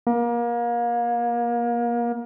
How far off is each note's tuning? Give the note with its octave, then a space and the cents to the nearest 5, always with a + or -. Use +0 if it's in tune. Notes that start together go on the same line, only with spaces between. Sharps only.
A#3 +30